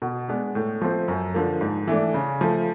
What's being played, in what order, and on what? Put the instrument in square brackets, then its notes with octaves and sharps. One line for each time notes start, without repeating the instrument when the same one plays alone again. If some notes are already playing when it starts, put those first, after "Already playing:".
[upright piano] B2
G#3 B3 D4
A2
F3 A3 C4
F#2
D3 F3 A#3
G#2
E3 A3 D4
C#3
F3 A3